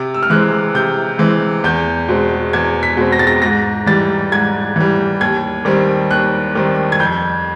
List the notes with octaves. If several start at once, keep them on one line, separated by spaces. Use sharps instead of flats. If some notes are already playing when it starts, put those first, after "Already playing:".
Already playing: C3
E6
F6
E3 G#3 C4 F#6
C3 G6
E3 G#3 C4
E2 G6
B2 G#3 C4
E2 G#6
B6
B2 G#3 C4
A#6
A6
A#6
G#2 A#6
E3 G3 A6
G#2 G#6
E3 G3
D#2 G#6
D#3 G3 C4
D#2 F#6
D#3 G3 C4
G#6
F2 G6